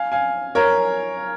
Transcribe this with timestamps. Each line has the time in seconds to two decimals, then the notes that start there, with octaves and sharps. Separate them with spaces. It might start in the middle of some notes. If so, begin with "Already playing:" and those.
Already playing: F5 G#5
0.12 F5 G#5
0.55 A#4 C#5